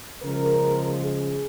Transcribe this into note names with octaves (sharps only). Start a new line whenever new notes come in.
C#3 F3 G#3 A#4
G#4